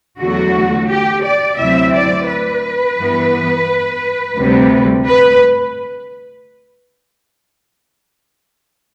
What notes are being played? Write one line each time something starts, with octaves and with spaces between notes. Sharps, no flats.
E2 D3 F#3 A3 F#4
G4
D5
D2 C3 F#3 C4 E4 E5
D5
B4
G2 E3 B3
D2 C3 G3
B4